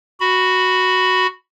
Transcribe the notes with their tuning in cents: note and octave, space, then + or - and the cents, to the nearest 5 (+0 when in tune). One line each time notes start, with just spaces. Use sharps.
F#4 +0 B5 +0